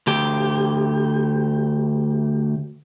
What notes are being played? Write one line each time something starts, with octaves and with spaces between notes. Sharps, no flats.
D2 G4